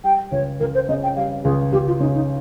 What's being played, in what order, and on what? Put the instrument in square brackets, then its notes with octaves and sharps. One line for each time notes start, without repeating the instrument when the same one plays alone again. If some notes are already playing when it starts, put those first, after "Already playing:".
[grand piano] G3 [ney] G5
[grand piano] C#2 [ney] C#5
[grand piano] C#2 [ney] A#4
[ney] C5
[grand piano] C#3 [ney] D#5
[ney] G5
[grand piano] G3 [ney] F5
[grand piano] C#2 [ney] G#4
[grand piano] C#2 [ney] G4
[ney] F4
[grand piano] C#3 [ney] D#4
[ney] D#4